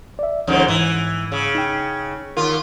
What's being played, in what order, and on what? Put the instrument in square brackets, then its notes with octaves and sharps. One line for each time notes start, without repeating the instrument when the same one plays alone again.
[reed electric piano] D5 E5
[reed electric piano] C2 C#4 C#5 [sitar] F2 G#2 D#3
[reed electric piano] G#2 [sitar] E3
[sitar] C#3
[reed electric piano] D#4 G5
[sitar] D#2 F4 [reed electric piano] A#4